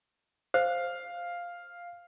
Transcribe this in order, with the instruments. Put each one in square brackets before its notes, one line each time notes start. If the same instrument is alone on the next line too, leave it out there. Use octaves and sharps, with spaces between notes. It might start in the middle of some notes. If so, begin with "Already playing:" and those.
[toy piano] C5 [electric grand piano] F5